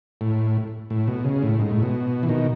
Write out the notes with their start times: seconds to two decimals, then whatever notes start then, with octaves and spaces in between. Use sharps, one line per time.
0.21 A2
0.90 A2
1.08 B2
1.25 C#3
1.43 A2
1.59 G#2
1.71 A2
1.83 B2
2.23 E3
2.29 B2 D#3